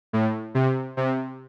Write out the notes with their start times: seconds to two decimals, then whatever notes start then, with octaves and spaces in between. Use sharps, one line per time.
0.13 A2
0.54 C3
0.97 C3